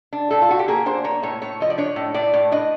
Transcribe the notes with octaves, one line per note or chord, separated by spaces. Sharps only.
D4
A2 A4
F4
A2 F#4
G4
A#3 G#4
D4 C5
A#3 C#5
A2 C#5
A2 C#5
F3 D#5
D5
D4 C#5
A2
A2 D5
A2
D4 D#5